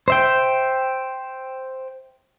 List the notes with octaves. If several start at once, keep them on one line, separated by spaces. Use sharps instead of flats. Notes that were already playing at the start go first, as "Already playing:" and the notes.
C5 E5 G5